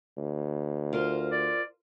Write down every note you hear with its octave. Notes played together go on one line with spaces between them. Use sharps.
D2
F4 A#4 C5
D5